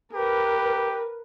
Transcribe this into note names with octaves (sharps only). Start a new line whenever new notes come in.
G4 A#4 B4